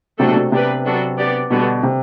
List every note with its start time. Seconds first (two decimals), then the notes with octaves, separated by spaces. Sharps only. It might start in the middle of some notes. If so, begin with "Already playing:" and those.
0.19 C3 F#3 A3 D4 F#4 A4
0.27 B2
0.36 C3
0.52 C3 B3 D4 G4 B4
0.85 F#3 B3 D4 F#4 A4
1.18 B3 D4 G4 D5
1.51 B2 D3 G3 B3 F#4
1.83 C3